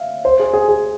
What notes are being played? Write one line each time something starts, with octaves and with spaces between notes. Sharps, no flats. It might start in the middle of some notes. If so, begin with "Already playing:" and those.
Already playing: E5 F5
C5
G#4
G#4
G#4